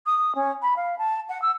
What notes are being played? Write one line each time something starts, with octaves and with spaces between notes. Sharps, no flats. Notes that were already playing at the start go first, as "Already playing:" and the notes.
D#6
C#4
B5
F5
A5
F#5
E6